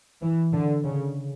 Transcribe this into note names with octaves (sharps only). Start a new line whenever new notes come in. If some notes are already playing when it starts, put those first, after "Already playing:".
E3
D3
C#3